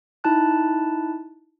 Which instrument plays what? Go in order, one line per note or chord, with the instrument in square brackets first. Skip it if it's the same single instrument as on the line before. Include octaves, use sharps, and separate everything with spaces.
[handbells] D#4 E4 A5 F#6